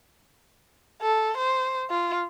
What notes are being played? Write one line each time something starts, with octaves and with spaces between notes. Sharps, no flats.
A4
C5
F4